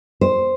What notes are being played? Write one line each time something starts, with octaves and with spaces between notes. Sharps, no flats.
C5